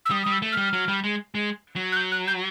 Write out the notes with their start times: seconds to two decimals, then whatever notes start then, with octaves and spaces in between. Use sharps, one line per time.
0.05 E6
0.11 G3 D#6
0.23 G3 D#6
0.32 E6
0.42 A3
0.52 G3 F6
0.73 F#3
0.88 G3
1.04 G#3
1.35 G#3
1.76 F#3
1.92 F#6
1.97 G6
2.12 F#6
2.27 G6